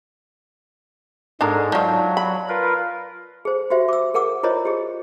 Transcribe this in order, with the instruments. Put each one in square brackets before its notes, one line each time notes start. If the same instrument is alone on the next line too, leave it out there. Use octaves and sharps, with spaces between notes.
[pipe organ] G#2 G#3 [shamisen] D4 A4 A#4
[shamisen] D#3 F3 [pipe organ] F#3 [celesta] D5 F5 A5
[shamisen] B5
[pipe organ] F4 A#4 B4
[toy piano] G#4 C5
F#4 G4 C5 E5
D6 E6
G#4 A#4 F#5 D6 E6
E4 F4 A#4 C5 C#5 D#5
G4 G#4